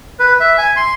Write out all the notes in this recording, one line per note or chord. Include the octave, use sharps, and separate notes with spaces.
B4
E5
G#5
C6